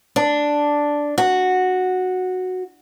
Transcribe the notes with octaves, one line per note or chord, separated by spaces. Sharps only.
D4
F#4